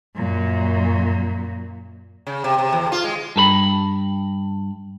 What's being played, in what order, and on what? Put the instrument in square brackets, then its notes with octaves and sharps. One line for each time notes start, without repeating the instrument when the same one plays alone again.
[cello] F#2 A#2
[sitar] C#3
C3
C3
E2
F4
G#3
[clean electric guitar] G2 A4 B5